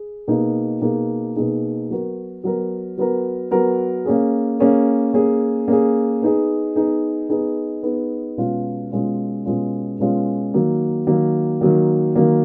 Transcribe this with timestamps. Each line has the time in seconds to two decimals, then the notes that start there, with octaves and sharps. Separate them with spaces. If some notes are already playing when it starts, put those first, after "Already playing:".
Already playing: G#4
0.28 B2 A#3 D#4 G#4
0.81 B2 A#3 D#4 G#4
1.36 B2 A#3 D#4 G#4
1.90 F#3 B3 F#4 A#4
2.44 F#3 B3 F#4 A#4
2.97 F#3 B3 F#4 A#4
3.51 F#3 B3 F#4 A#4
4.05 A#3 C#4 G#4
4.60 A#3 C#4 G#4
5.14 A#3 C#4 G#4
5.68 A#3 C#4 G#4
6.22 B3 D#4 G#4
6.76 B3 D#4 G#4
7.29 B3 D#4 G#4
7.83 B3 D#4 G#4
8.38 B2 G#3 C#4 F4
8.92 B2 G#3 C#4 F4
9.46 B2 G#3 C#4 F4
9.99 B2 G#3 C#4 F4
10.54 D#3 F#3 A#3
11.07 D#3 F#3 A#3
11.61 D#3 F#3 A#3
12.16 D#3 F#3 A#3